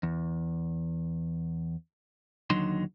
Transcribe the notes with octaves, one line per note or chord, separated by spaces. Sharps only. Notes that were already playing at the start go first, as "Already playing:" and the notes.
E2
D#2 D3 F#3 D#4 C6